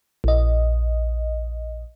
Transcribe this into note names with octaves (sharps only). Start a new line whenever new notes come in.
A#1 D#5